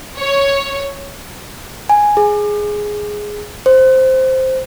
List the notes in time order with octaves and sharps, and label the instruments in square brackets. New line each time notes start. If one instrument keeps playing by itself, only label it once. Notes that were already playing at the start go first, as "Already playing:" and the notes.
[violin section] C#5
[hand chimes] G#5
G#4
C5